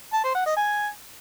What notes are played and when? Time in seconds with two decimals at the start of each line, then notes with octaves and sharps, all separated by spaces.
0.13 A5
0.24 C5
0.35 F#5
0.46 D#5
0.57 G#5